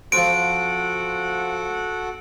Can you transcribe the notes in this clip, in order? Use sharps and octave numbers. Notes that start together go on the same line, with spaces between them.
F3 C4 F#4 A4 F#5 D7